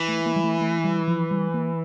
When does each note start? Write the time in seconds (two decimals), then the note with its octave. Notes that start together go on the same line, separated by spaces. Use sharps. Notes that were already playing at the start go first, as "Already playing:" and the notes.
Already playing: E3
0.08 A3
0.26 A#3
0.36 G3
0.44 A3
0.61 A3
0.84 G3
1.07 F3
1.31 G3
1.54 A#3